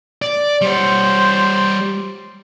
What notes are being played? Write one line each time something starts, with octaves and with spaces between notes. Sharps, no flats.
D5
G3 C5 C#5